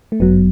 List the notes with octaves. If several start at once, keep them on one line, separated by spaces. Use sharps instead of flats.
A3
G1 F#2 F#3 B3